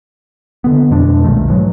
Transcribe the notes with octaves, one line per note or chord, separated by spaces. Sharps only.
D3 B3
F2 B2 G#3 D4
B1 A#2 D#3 A3
G#2 E3 F#3 G#3